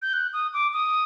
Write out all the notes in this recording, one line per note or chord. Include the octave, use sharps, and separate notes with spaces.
G6
F#6
D#6
D6
D#6